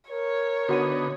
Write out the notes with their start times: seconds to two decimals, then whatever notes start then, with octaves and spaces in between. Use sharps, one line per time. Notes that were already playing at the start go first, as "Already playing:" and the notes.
0.10 A#4 C#5
0.69 D3 B3 D#4 F#4 F#5 D#7